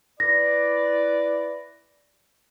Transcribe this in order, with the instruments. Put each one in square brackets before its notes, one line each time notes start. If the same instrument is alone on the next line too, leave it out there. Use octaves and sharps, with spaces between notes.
[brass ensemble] E4 B4 D5 [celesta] A#6